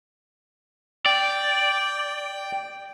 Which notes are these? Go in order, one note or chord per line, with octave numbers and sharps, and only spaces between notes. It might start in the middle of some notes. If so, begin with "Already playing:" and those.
D5 G5